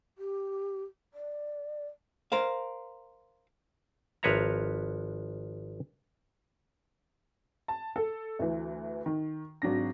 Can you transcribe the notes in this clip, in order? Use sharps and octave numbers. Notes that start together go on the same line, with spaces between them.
G4
D5
A#4 C5 F5
G#1 F3 B4 C#5 E5 A#5
A5
A4
D2 E3
D#3
G#1 F#3 D4 A#6